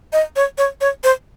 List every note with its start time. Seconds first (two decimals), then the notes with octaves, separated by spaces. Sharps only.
0.13 D#5
0.36 C#5
0.58 C#5
0.81 C#5
1.04 C5